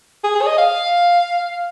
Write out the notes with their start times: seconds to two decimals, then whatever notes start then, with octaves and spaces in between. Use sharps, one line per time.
0.24 G#4
0.35 G#4
0.41 C#5
0.47 D#5
0.58 F5